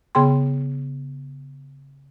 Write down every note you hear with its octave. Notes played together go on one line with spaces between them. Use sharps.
C#3 B3 G#4 G5 C6